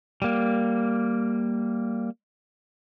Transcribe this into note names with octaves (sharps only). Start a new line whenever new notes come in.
G3 A#3